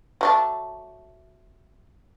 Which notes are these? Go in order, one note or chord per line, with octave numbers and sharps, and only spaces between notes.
F#3 A3 D4